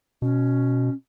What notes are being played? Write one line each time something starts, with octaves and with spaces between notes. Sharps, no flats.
B2 C#4